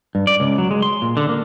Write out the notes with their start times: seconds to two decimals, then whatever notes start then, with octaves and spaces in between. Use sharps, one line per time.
0.15 G2
0.27 D5
0.40 C#2
0.58 F#3
0.71 G#3
0.82 C6
1.02 A#2
1.17 D3
1.29 A#3